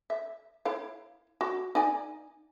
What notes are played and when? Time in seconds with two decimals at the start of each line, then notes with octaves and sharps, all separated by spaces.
0.10 E5
0.65 E4 C#5 F5
1.41 F#4
1.75 D#4 D5 G#5